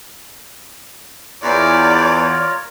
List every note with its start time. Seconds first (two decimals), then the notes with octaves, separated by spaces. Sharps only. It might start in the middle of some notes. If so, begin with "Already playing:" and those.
1.43 E2 F4 A#4 C#5 D5